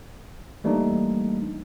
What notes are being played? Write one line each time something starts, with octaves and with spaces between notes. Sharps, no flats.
E3 G3 A3 A#3 D4 D#4